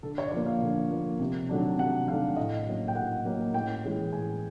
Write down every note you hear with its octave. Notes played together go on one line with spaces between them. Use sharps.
D3 A4
C#5
D5
F3 A#3 C#5
F5
D3
F3 A#3
C3
D#3 F#3 A3 D4
C3 F#5
D#3 F#3 A3 D4 F5
A2 D#5
F#3 A#3 C#4
G5
A2 F#5
F#3 A#3 C#4
A2 G5
E3 G#3 C#4
A2 G#5